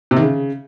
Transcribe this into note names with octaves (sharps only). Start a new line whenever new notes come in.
C3
D#3
C#3